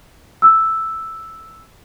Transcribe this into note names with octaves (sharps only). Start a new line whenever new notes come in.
E6